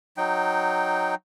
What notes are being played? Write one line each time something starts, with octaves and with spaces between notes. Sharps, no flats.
F#3 D#4 G5